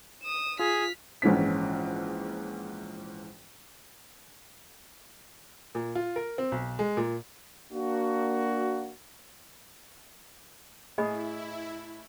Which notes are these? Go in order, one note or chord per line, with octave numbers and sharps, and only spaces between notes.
D#6 E7
F4 G#4 F6 B6
A#1 G#2 E3 C#4 B6
A#2
F4
A#4
C4
B1
G#3
A#2
A#3 D4 F#4
A2 E4 G#4 D#5 G#5 B5